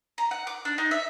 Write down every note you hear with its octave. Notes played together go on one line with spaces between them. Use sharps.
A#5
F#5
D6
D4
D#4
E5